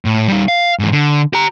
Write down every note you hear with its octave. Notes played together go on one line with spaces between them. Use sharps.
A2
G3 D#4
F5
G#2 E3
D3
G4 A#5